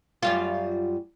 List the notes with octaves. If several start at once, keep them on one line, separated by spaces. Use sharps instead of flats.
F#2 G3 F4